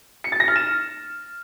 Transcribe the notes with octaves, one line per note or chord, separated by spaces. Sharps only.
C#7
A6
A#6
F6
E7